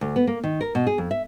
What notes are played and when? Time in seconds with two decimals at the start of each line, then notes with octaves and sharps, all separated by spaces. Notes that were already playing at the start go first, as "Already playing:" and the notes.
0.01 D2
0.16 B3
0.27 A#3
0.44 D#3
0.61 A#4
0.75 B2
0.87 G#4
0.98 F2
1.11 E5